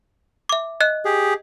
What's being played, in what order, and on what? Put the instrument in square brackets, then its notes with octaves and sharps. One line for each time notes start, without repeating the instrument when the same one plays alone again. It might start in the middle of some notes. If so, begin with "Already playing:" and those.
[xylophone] E5 D6
D#5 F#6
[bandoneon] G4 G#4